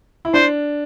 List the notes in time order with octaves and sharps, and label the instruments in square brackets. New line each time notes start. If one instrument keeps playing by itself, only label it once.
[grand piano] E4
[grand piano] D4 [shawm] C5